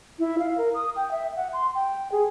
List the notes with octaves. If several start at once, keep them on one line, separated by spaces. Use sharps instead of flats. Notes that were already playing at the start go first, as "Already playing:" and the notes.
E4
F5
A#4
D#6
G5
E5
F#5
C6
G5
G#4